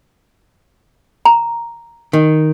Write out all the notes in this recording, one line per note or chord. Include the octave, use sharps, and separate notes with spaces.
A#5
D#3